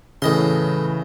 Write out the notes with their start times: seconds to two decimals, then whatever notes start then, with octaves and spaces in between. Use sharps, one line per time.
0.22 A2 C#3 E3 D#5 C6